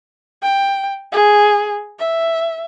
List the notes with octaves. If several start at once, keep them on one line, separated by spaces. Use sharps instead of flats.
G5
G#4
E5